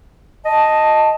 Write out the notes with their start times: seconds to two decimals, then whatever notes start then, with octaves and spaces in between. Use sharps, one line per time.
0.46 D#5 A5